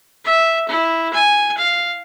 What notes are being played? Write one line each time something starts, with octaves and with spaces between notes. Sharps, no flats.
E5
E4
G#5
F5